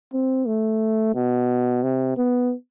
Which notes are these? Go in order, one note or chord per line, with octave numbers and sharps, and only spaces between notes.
C4
A3
B2
C3
B3